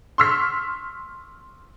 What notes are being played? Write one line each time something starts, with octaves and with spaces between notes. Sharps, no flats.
C6 C#6 E6 F6 B6